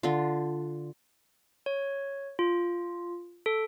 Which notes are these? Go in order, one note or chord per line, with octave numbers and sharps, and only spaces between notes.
D3 F4
C#5
F4
A4